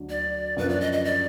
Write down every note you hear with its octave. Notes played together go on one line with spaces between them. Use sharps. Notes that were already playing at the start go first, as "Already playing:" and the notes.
Already playing: D2 D3 F#3 D4
D5
F#2 D3 F3 B4
D5
D#5
D#5
D5